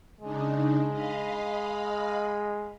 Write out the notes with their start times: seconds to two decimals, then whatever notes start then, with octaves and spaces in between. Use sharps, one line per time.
0.21 C#3 G#3 D4 D#4
0.90 D#5 F5 B5